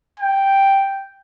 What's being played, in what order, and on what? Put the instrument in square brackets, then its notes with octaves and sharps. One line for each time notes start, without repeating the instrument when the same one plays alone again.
[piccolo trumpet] G5